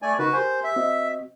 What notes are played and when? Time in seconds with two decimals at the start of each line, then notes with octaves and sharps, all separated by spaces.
0.02 A3 D5 G#5
0.19 C#3 D#4 F#4 A#4 B4
0.33 G4 A#4 C5 G#5
0.64 E5
0.76 C4 F#4 D#5